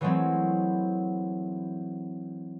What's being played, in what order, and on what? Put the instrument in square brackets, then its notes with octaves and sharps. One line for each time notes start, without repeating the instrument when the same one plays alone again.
[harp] E3 F#3 G#3 A3 C4